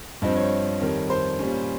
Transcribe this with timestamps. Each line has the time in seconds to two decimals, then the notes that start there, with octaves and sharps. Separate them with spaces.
0.22 G2 F3 C4 D#5
0.36 C#5
0.81 F2 D#3 G3
1.10 C5
1.39 A#2 G3 C#4